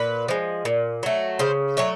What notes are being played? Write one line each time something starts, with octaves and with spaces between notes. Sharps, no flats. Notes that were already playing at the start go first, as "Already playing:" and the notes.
Already playing: A#2 B4
F3 G#3
A#2
F#3 A3
C#3 C5
F#3 A3 C#5